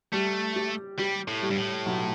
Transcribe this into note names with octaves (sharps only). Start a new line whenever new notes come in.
G3 A3
G4
G3 G4
A2
G3
G2
A2
B1